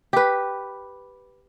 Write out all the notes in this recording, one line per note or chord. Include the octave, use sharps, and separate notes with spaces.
G4 B4